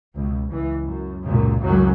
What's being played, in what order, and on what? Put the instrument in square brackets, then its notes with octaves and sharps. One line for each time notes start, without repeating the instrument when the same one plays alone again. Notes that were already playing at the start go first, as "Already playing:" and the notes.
[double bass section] C#2 B2
C#2 E3
F#2
C#2 F#2 A#2
C#2 F#2 A2 D#3 F#3 C#4